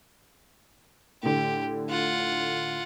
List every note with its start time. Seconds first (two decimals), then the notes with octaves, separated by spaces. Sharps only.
1.23 A2 D3 G4
1.89 F4 F#5